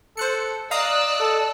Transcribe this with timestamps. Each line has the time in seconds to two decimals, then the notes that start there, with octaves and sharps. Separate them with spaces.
0.17 A4 C5 F#6 C#7
0.71 D5 D#5 F5 A#5 D#6 E6 F#6
1.20 A4